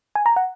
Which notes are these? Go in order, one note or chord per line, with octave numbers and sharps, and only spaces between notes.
G#5
A#5
F#5